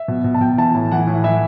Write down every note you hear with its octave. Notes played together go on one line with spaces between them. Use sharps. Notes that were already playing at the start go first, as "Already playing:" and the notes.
Already playing: E5
B2
B2
A5
B2 G5
E3 A5
A2
E3 F#5
A2
E3 E5